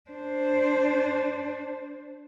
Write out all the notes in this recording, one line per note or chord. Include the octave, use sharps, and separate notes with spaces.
D4 C5